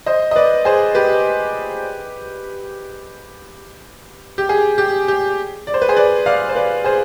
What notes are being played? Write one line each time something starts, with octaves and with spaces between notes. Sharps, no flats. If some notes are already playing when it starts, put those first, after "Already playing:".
C5 D#5
D#5
B4 D5
G#4 C5
G4 B4
G4
G#4
G4
G4
D5
C5
B4
G#4 C5
B4 D5
D5 F5
C5
B4 D5
G#4 C5